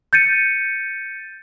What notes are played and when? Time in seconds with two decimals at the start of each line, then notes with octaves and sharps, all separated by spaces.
0.13 G6 A6 C#7 D#7